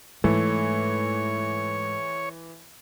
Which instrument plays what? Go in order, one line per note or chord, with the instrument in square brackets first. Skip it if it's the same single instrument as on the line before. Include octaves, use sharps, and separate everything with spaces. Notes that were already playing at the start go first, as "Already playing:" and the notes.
[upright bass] G#2 [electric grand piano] E3 [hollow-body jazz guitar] A3 [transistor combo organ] C#5